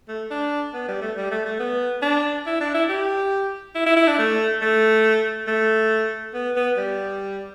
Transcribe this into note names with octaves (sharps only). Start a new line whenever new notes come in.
A3
D4
B3
G3
A3
G3
A3
A3
B3
D4
E4
D4
E4
G4
E4
E4
E4
D4
A3
A3
A3
B3
B3
G3